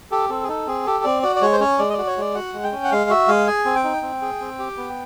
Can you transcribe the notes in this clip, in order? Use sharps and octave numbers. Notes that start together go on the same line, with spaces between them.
G4 A4
C4 A4
G#4
D#4 A4
C4 G#4
G4 A4
C4 D5
F#4 D5
D5
G#3 C#5
C5
C#4 C#5
G#3 D5
D#5
D5
F#4
C#5
G#3 D5
F#4 F#5
G#3
G5
C#4
F#5
G#3 F5
F#4 E5
G#3 F5
G#4 G#5
C4
G5
D#4
C4
G#4
C4
G4
B3